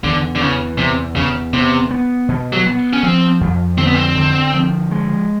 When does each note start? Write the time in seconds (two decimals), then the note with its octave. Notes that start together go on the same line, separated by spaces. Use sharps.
0.04 E2 D3
0.35 D3
0.41 C#3 E3
0.78 E2 C3
1.16 E2 C#3
1.53 C3 B3
1.91 B3
2.29 B2
2.53 F#3
2.66 B3
2.93 C#4
3.03 F3 C4
3.41 F2
3.78 D3 C4
3.87 B3
3.94 C4
4.16 D3
4.54 F3
4.91 G#3